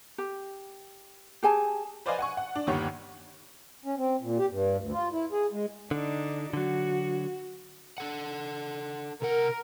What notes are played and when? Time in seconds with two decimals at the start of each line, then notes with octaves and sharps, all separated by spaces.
0.18 G4
1.43 G4 G#4 G#5 A5
2.06 B4 C5 D5 D#5 F5 G#5
2.19 F#5 G#5 C#6
2.37 F#5
2.55 D4
2.67 G1 D#2 G4 C#5 F#5 C#6
3.85 C#4
3.97 C4
4.21 A#2
4.38 G4
4.51 G2
4.80 D2
4.93 F4
5.13 E4
5.32 G#4
5.52 G#3
5.91 D3 D4 D#4
6.53 D3 F#3 F#4
7.98 D4 A4 F#5
9.22 C3 A#4 F#5